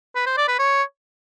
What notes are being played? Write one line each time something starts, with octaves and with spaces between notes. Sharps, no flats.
B4
C5
D5
B4
C#5